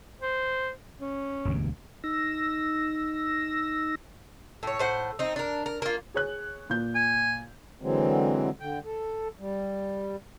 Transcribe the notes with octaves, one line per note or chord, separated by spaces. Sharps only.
C5
C#4
E1 D2 G2
D#4 E6 A#6
A2 C#5
A2 C5 F#5
C4 D#4
D4 A#4
A#4
A#3 F4
G#4 C#5 F#6
A#2 G6
G#5
D3 E3 F#3 G#3 C4
D3 G5
A4
G3